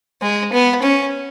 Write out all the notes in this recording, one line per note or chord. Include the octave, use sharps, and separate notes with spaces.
G#3
B3
C#4